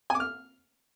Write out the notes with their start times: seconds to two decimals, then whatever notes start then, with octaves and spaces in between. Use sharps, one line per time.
0.10 G#5
0.15 D6
0.20 F6